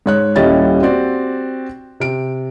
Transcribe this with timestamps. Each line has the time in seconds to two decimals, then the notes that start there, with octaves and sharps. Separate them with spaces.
0.06 G#2 C#5 F#6
0.36 D#1 G3 C#4 E4 D#5 A6
0.83 C4 F#4 G4 D5
2.00 C3 D7